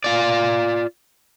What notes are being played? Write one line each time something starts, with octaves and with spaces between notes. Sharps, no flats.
F4 D5